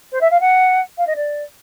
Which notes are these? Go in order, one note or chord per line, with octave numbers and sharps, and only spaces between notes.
C5
E5
F5
F#5
F5
D#5
D5